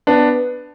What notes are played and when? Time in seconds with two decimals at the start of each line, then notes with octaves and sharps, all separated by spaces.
0.07 B3 D4